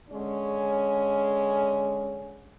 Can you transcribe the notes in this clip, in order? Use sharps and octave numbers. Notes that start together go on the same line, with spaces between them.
D3 G#3 C#4